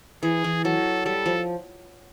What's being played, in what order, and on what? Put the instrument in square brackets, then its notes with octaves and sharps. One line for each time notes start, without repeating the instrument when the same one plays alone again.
[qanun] E3 [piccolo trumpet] G#4
[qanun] E3
[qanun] F#3 [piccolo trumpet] A4
[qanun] G3 [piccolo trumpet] A4
[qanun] F3